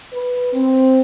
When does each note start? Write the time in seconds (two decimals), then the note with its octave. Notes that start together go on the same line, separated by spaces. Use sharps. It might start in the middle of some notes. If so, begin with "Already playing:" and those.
0.12 B4
0.53 C4